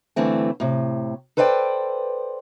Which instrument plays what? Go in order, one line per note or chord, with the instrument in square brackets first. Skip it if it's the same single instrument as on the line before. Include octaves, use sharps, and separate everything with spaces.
[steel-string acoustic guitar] G2 D3 E3 A3 C4
A2 C3
A4 B4 C5 D5 F5 G5